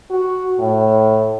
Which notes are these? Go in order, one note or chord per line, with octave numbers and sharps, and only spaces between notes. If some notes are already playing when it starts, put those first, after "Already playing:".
F#4
A2